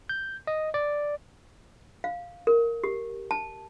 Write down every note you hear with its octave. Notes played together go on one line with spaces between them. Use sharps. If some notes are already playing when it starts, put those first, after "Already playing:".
G6
D#5
D5
F5
A#4
G4
A5